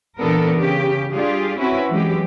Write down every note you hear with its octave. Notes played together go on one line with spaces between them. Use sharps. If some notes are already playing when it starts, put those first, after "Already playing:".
A#2 E3 B3 D4 A4 A#4
C#3 G4
G3 D4 F4 G4 G#4
C4 C#4 E4 F#4 B4 E5
E3 F#3 G#3 G4